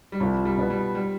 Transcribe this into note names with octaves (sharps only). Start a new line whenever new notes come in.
G3
C2 F3
F3
G3
B2 B3
G3
G3